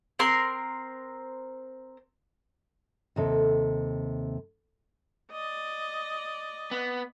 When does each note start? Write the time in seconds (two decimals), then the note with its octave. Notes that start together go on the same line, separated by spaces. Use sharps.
0.19 C4 A#4 C6
3.16 D#2 C3 A4
5.31 D5 D#5
6.71 B3